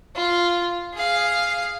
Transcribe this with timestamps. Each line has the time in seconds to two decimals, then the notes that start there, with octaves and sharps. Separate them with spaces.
0.16 F4
0.94 G#4 F5